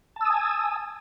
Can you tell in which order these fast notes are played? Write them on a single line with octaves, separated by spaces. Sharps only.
A5 E6 D#6 G#5